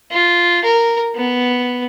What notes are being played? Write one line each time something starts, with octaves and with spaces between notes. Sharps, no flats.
F4
A#4
B3